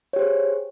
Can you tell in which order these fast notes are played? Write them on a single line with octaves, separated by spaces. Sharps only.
C#5 G4 C5 G#4